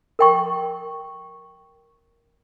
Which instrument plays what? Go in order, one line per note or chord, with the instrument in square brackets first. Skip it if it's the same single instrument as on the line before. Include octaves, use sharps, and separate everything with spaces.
[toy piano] A#4 G5 C#6